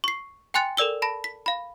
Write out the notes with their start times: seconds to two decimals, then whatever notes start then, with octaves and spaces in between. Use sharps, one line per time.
0.04 C#6 C7
0.54 G5 G#5 C6 F#6 A6 C#7
0.77 A4 A#4 D5 E6 G7
1.02 A5 B5 A#6
1.24 B6
1.46 F5 B5